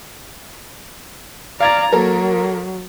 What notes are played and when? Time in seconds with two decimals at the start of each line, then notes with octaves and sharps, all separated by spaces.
1.60 D5 F5 A#5 G#6 A6
1.92 F#3 A#3 A4 A#4